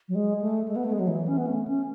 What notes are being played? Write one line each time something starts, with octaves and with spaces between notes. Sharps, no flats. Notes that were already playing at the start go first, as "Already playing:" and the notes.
F#3
G#3
A3
G#3
B3
A3
G#3
F#3
E3
C#4
B3
A3
C#4